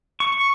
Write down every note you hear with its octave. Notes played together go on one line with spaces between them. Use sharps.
C#6